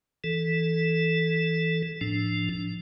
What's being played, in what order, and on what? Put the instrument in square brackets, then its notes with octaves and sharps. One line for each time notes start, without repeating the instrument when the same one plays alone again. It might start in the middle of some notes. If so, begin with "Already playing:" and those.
[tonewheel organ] E3 A4
A2 F3 D4